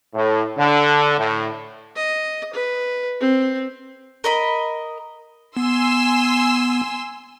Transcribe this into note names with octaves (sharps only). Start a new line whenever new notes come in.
A2
D3
A2
D#5
B4
C4
A#4 D#5 B5
B3 G#5 C6 E6